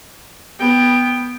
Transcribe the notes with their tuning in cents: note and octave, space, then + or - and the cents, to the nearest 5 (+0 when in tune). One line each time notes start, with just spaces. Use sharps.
B3 +0 G5 +10